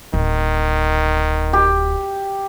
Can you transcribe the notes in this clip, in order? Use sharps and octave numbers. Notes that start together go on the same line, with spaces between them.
D1 D#3
G4